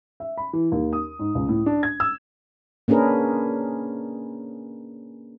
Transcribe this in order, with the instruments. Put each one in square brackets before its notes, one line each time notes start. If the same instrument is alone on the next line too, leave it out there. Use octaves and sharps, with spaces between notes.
[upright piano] E5
B5
E3
D#2
D#6
G#2
C#2
A2
D4
G#6
E6
[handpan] A#3 C#4 D4 G#4 A#4 B4